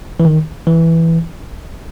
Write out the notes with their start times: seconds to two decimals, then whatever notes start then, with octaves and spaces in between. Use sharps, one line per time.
0.20 E3
0.25 D#3
0.67 E3